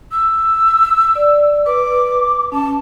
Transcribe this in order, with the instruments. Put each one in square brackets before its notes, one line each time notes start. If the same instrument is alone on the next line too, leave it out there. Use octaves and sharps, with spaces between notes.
[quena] E6
[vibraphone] D5
[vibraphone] B4 [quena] D6
[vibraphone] C#4 [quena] A5